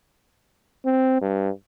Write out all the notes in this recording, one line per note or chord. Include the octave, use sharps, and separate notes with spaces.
C4
G2